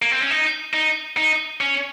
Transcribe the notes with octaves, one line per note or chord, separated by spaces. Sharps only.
A#3
C4
C#4
D#4
D#4
D#4
C#4